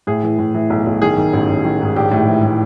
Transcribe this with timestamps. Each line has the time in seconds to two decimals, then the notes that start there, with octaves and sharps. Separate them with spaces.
0.07 A2 G#4
0.23 E3
0.39 A2
0.54 E3
0.70 B1
0.87 B1
1.02 D#3 G#4
1.18 D#3
1.33 A1
1.49 A1
1.65 D#3
1.81 G#2
1.96 A#1 G4
2.11 A2
2.28 E3
2.44 A2